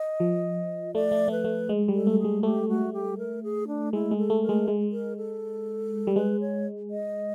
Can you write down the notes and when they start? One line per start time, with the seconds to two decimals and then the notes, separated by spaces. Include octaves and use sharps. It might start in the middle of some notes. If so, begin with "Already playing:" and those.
Already playing: D#5
0.20 F3
0.94 A3 D5
1.12 A3
1.28 A3
1.31 B4
1.44 A3
1.69 G#3
1.88 G3
1.94 A4
2.07 A3
2.19 G#4
2.24 G#3
2.43 A3 G4
2.69 F#4
2.93 G4
3.18 A#4
3.43 G#4
3.68 D4
3.93 G#3 E4
4.11 G#3
4.17 A4
4.30 A3
4.42 A#4
4.49 G#3
4.68 G#3
4.92 A#4
5.17 A4
6.07 G3
6.16 G#3 B4
6.40 C#5
6.90 D#5